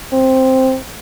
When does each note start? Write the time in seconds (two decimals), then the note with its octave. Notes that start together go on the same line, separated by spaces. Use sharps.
0.13 C4